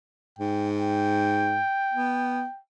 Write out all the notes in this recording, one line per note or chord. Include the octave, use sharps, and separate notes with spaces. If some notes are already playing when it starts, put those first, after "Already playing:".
G#2 G5
G5
B3